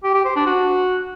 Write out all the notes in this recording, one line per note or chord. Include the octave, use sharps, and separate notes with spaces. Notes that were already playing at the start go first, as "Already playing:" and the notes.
G4
G4
C5
D4
F#4